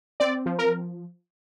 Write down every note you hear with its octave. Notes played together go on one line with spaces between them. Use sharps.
C4 D5
F3
A#4